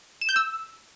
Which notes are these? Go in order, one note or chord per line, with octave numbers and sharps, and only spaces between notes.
E7
G6
E6